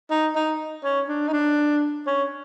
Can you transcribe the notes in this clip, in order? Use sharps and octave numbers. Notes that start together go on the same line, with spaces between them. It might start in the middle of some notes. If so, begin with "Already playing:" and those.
D#4
D#4
C#4
D4
D#4
D4
C#4